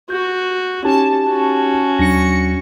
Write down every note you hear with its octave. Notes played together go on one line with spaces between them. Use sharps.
F#4 G6
C#4 D#4 G4 A5
C#4 F#4
D#2 F#3 D4 A#6 C#7